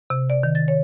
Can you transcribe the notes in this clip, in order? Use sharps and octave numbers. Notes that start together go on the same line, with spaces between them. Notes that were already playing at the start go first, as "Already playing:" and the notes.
C3
D5
D#3
A6
C#5